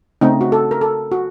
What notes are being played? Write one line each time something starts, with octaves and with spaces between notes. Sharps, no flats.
C#3 A3 C4 D#4
F#4
A4
A#4
A4
F#4